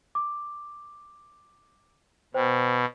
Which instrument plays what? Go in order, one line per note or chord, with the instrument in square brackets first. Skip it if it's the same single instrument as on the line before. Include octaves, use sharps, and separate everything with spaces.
[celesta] D6
[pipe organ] B2 [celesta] C5 G5